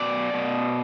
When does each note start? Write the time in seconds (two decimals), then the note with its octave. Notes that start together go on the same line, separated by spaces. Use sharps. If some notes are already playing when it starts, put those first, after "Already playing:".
Already playing: B2 D5
0.33 B2